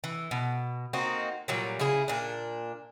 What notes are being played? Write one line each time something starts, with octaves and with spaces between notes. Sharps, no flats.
E3
B2
A#3 C4 D#4 F#4
A#2 F#3 G3
C#3 E4 G#4
A#2 D4